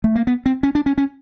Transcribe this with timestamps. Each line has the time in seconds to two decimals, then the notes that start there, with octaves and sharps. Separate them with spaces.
0.04 A3
0.16 A#3
0.27 B3
0.46 C4
0.63 C#4
0.75 D4
0.86 C#4
0.98 C#4